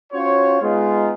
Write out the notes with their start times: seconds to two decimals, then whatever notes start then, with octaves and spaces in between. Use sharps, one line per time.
0.13 C#4 F4 F#4 C5 C#5
0.61 G#3 B3 D#4 F4